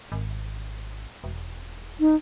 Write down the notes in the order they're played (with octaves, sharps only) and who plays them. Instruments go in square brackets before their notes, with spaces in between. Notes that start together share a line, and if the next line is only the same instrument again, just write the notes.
[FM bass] G#1
E1
[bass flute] D#4